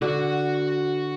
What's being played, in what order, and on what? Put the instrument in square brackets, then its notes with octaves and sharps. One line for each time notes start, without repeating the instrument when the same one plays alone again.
[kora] D3 [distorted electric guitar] F#4 F#5